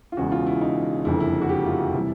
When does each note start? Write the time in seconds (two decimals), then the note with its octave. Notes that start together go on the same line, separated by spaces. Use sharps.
0.12 F4
0.17 E1 E2 C#3 F#4
0.32 F4
0.47 E4
0.61 D#4
1.05 F#1 F2 D3 E4
1.20 E4
1.41 F#4
1.49 G4
1.66 F4
1.71 F#4
1.94 C3 E3 G3 E4